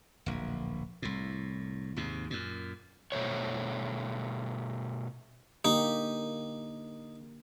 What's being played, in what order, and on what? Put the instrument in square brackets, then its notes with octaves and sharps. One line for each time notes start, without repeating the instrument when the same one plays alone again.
[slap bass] D1 A#1
C2 A2
D#2 G#2 C3
F#2 A#2
[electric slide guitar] B2 A3 C5 C#5
[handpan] D3 A#3 G4 [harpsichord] D#4